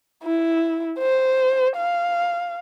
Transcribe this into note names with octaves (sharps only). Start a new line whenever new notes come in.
E4
C5
F5